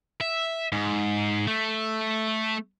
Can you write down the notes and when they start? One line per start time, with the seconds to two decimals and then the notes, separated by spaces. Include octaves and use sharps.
0.21 E5
0.72 G#2
1.48 A3